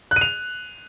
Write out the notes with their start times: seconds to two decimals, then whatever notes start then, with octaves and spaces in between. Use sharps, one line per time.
0.11 F#6
0.16 D#7
0.21 F7